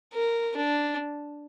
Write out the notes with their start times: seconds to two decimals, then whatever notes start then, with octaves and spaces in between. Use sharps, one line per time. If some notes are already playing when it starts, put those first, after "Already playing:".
0.13 A#4
0.57 D4